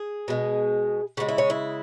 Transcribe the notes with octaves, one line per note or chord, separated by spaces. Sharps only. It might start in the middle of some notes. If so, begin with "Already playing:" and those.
Already playing: G#4
B2 G#3
C#3 E3 G#3 F#4
E4
C#4
E4